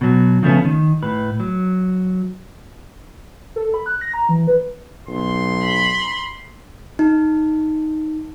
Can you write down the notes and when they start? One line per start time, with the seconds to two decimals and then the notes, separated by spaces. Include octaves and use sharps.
0.01 B2 F#3
0.43 C#3 F3 A3 B3 C#4
0.65 D#3
1.03 A2 B4
1.40 F#3
3.56 A4
3.74 B5
3.86 F#6
4.01 A#6
4.14 A#5
4.29 E3
4.47 B4
5.08 B1 C6
5.63 B5
6.99 D#4